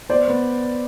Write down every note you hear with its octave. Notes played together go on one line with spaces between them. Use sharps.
B3 C5 D5
B3